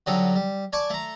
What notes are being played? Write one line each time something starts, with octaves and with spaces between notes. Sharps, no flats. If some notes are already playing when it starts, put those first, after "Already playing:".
D3 F#3 G3 D#4 A4
G3
D5 G#5 A5 C#6 D6
A3 A#5